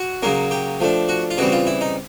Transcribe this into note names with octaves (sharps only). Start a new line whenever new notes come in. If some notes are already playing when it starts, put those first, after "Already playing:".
Already playing: F#4
C#3 F#3 A#3 C#4
G4
F3 A3 D4
F#4
F4
C#3 E3 G3 C4 F#4
F4
E4
D#4